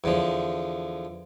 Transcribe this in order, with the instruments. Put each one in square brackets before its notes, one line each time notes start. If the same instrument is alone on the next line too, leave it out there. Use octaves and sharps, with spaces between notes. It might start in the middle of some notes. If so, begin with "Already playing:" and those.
[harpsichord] E2 D3 F3